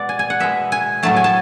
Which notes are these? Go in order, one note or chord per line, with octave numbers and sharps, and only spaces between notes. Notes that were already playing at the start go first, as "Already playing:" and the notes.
Already playing: B2 G#3 D5 F#5
G#5
G#5
F#5
B2 G#3 E5
G#5
A2 F#3 A3 A5
G#5
A5